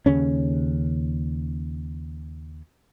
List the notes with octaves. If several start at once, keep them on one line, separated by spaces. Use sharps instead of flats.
D#2 C#3 C#4